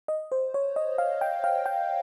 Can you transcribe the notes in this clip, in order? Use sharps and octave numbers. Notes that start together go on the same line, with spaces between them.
D#5
C5
C#5
D#5
F5
G5
F5
G5